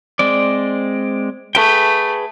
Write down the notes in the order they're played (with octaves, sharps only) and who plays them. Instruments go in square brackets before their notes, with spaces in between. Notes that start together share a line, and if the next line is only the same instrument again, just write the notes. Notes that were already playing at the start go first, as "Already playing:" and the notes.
[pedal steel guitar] G#3 C4 D5
[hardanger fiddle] A3 [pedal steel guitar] G#4 B4 G5